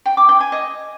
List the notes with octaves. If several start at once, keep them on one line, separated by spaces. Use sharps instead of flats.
G5
D6
G5
G#5
D#5